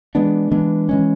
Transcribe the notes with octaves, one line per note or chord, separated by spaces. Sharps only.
E3 G#3 B3 D4
E3 G#3 B3 D4
E3 G#3 C#4